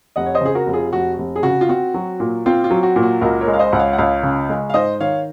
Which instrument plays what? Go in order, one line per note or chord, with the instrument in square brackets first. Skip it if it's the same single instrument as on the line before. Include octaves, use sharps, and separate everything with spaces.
[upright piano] F1 [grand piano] D#5 F#5
[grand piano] C#5
C5 D#5
[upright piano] C#3 [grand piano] G#4
[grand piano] F#4 A#4
[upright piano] F1
[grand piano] F4 G#4
[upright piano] F1 [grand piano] F#4
[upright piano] F1
[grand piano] G#4
[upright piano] C#3 [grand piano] F#4
[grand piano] F4
[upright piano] C4 [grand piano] F#4
[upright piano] F#3
A#2
[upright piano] C4 [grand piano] F4
[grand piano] F4
[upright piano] F#3
[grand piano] F#4
[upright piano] A#2
[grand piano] F#4
[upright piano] C#2 [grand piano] F#4 A#4
[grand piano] A#4 C#5
[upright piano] G#3
[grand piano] F5
C5 D#5
[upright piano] C#2 [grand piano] F#5
[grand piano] C#5 F5
F#5
[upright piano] C#2 [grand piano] C#5 F5
[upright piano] C#3
G#3
[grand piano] F5
[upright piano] G#2 [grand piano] C5 D#5
[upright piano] D#3 [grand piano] C#5 F5